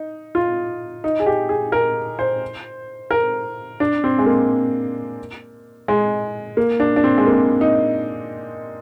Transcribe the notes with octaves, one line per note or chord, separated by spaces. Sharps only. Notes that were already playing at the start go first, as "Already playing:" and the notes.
Already playing: D#4
F4
D#4
G#4
G4
G#4
A#4
C5
A#4
D4
C4
G#3
A#3
G#3
A#3
D4
D4
C4
G#3
A#3
D#4